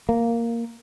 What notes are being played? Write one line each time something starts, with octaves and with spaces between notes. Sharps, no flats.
A#3